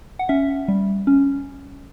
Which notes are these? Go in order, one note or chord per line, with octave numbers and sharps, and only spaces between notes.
F#5
C#4 E5
G3
C#4